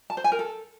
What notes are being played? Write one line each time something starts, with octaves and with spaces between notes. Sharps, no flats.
A5
C5
G#5
A#4
A4